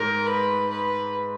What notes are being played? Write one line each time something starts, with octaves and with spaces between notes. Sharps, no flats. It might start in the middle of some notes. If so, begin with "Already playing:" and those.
Already playing: G#2 A#4
B4
B4